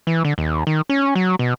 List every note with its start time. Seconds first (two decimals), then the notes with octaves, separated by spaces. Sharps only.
0.07 E3
0.25 D3
0.38 D#2
0.67 D#3
0.89 C#4
1.15 F#3
1.39 B2